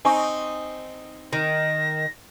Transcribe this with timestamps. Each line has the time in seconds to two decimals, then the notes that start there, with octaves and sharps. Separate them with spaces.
0.05 C4 D#4 G#5 C#6
1.33 D#3 A#6